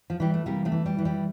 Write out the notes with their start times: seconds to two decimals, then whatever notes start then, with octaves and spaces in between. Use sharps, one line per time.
0.10 F3
0.20 E3 G3
0.34 A3
0.46 C3 G3 A#3
0.65 F3 A3
0.72 E3
0.86 G3
0.98 E3
1.05 G3